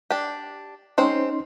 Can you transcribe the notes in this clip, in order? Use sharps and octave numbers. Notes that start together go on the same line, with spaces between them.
D4 G4
G#3 C4 C#4 D#4 C5 C6